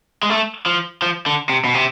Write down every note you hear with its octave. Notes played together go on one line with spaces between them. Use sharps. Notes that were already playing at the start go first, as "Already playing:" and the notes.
G#3
A3
F3
F3
D3
C3
B2
C3